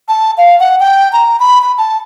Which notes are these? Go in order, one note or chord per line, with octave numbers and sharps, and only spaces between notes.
A5
F5
F#5
G5
A#5
B5
B5
A5